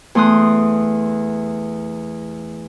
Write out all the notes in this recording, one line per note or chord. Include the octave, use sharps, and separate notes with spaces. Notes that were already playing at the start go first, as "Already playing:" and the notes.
E2 A3 C6 D#6 F#6